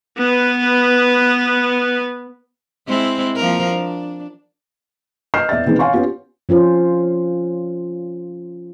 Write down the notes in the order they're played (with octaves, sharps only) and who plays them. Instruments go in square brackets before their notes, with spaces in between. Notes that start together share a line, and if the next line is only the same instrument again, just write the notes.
[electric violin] B3 B4
[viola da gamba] G#3 C4 E4
F3 A#3 A#4
D4
[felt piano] D#5 F6 G6 C7 E7
E2 D5 E5 A6
B2 D#3 E3 G#3 C4
C#5 F5 G#5 C6 C#6
B3 C#4 F4 G4
[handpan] F3 C#4 F4 C5